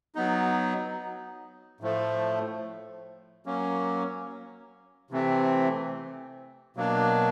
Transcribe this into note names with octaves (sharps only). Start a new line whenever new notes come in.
F#3 B3 D#4
A2 F3 A3
F#3 A#3 C#4
C3 E3 A3 C4
B2 F#3 A#3 D4